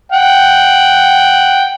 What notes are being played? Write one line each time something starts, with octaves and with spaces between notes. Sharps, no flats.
F#5 G5